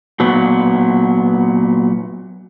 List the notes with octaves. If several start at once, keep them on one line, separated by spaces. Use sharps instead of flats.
A#2 F#3 B3